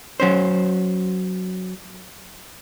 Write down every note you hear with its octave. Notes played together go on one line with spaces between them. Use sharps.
F#3 C#4 C5